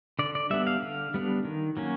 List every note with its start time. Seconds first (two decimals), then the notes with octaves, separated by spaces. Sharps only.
0.19 D3 D5
0.35 D5
0.50 G3 B3 D4 E5
0.67 F5
0.82 D3
1.14 G3 B3 D4
1.45 D#3
1.77 F#3 A#3 C#4